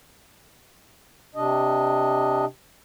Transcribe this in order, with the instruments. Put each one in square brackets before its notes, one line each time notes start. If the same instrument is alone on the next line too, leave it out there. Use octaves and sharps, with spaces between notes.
[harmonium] C3 D4 D#5